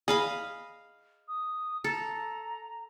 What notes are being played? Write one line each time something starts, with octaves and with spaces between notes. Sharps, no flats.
G#4 D#5 F5 B5
D#6
A4 A#5